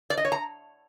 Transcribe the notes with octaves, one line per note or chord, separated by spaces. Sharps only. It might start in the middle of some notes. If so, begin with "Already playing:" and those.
D5
D#5
C#5
A#5